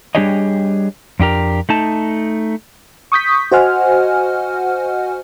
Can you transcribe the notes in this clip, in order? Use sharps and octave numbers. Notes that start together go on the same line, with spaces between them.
G3 D4 G4 G#4 C#5 D#5
F2 D4 G4 A#4
A3 D#4 A5
C#6 D#6 G6 B6
F#4 C5 D#5 F#5 G#5 F6